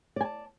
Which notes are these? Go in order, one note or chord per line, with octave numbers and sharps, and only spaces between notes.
D5 G#5 A5